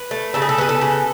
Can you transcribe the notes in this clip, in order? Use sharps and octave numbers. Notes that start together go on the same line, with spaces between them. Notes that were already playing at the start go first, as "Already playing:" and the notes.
Already playing: B4
A3
C#3 A4
G#4
A4
B3 G#4
A4
C#3